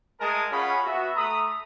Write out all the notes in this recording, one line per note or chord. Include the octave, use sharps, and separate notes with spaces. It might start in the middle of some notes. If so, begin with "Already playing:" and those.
G#3 A3 A#4 G#5 A5 D#6
C#4 F4 G#4 C#5 F#5 B5
B3 F#4 E5
A3 A#5 B5 D#6